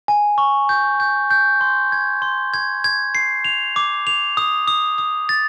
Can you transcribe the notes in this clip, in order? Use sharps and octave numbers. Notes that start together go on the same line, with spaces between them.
G#5
C#6
G6
G6
G6
C6
G#6
C6
G#6
G#6
C7
F7
D6
F7
D#6
D#6
D#6
A6